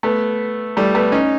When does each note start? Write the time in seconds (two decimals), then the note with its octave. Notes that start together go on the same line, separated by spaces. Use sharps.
0.03 A3 B3
0.77 G3 A3
0.95 A3 B3
1.12 C#4 D#4